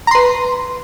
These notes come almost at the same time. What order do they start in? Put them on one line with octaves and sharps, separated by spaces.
A#5 C6 B4